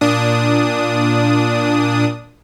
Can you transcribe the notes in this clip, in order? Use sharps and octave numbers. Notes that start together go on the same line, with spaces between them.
A#2 D4 D#6